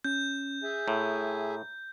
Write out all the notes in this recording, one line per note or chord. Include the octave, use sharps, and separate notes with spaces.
C#4 G6
G#4 E5 G#5
A2 A#5